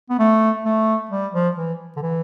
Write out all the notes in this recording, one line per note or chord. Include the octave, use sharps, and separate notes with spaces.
B3
A3
A3
G3
F3
E3
D3
E3